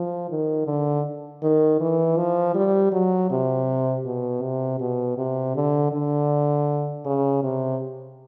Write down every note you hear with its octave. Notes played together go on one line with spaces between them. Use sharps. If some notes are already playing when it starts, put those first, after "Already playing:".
Already playing: F3
D#3
D3
D#3
E3
F3
G3
F#3
C3
B2
C3
B2
C3
D3
D3
C#3
C3